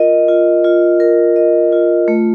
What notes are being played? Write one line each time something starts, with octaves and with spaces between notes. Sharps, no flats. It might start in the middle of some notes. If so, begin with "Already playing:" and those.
Already playing: F4 A#4 D#5
F4
F4
A#4
D#5
F4
A3